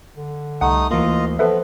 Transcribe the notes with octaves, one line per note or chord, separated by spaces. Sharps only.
D3
C2 G3 A3 D#4 F#5 D#6
D2 E3 A#3 F4 D#5
F3 B3 A4 B4 E5